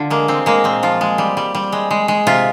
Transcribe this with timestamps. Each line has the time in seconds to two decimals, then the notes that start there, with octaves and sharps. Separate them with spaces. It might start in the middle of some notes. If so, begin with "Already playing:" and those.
Already playing: D3 F4
0.10 G#3 A#3
0.28 G#3 C4
0.46 G#3 A#3
0.64 A#2 C4
0.83 F3 F4
1.01 G#3
1.18 G3
1.37 G3
1.55 G3
1.72 G#3
1.91 G#3
2.08 G#3
2.27 C3 F4